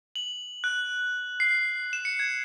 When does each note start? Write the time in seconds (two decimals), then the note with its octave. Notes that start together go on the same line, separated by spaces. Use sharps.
0.16 F#7
0.64 F#6
1.40 C7
1.93 E7
2.05 C#7
2.19 G#6